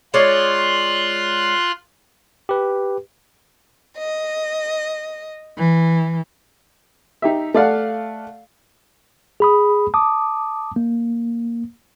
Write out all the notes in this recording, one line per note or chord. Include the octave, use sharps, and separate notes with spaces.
G#3 F4 C#5 D5 C6 F#6
G4 B4
D#5
E3
D#4 G4 E5
A3 D5 F5 F#5
G#4 B5 D#6
A5 D6 D#6
A#3